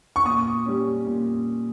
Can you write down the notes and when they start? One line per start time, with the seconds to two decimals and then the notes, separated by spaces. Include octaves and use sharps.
0.16 C#6
0.26 A#2 D#6
0.66 G3 C#4
1.07 A#2